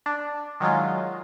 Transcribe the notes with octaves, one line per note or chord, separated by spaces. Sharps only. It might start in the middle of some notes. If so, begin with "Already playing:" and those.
D4
D#3 F#3 G#3 F4